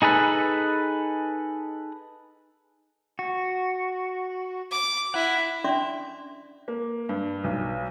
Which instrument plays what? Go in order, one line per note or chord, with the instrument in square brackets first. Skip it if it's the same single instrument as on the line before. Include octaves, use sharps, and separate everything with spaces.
[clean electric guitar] D#4 G#4 A4 B4
[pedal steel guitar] F#4
[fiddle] D6
[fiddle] E4 [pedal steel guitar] F#5
[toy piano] C#4 D4 D5 E5 C6 D6
[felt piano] A#3
G2
B1